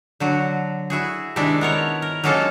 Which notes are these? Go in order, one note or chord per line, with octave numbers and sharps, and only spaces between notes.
D3 F#3 F#4
E4 F#4 G#4
C3 D#3 G#3 D4 E4
B3 A#4 C#5
A#4
F#3 G#3 A#3 C#4 F4 A4